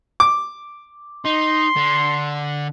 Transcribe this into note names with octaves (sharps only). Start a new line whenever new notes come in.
D6
D#4 C6
D3